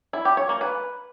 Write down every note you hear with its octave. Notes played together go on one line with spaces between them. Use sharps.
E4
G4
C#5
A#3
B4